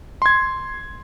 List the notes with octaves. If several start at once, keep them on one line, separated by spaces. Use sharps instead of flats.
C6 G#6